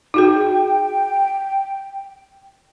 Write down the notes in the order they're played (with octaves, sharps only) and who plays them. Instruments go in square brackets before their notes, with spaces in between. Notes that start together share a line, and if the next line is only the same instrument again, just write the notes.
[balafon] D#4 F#4 G#4 [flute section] G5